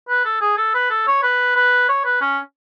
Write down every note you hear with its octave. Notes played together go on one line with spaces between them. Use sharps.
B4
A4
G#4
A4
B4
A4
C#5
B4
B4
C#5
B4
C#4